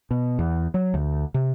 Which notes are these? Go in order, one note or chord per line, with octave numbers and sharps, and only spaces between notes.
B2
E2
F#3
D2
C3